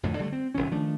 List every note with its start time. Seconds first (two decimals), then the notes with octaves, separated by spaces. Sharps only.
0.03 F2 A2 D3 D#3
0.19 D3 G3 A3
0.32 C4
0.55 F1 C#2 D#3 C#4
0.71 D#3 F3 A3 D4